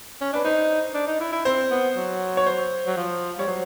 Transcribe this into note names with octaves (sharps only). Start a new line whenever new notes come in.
C#4
D4 B4
D#4 C5
D4
D#4
E4
E4
C4 C5
B3
F#3
C#5
C5
F#3
F3
G3 C#5
F#3 C5